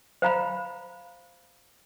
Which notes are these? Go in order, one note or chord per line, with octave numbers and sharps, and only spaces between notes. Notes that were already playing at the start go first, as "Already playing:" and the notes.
C5 F5 A#5 B5